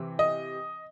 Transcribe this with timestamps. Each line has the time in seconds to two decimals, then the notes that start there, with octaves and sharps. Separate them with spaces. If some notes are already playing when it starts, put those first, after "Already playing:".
Already playing: C3 E3 C4
0.19 D#5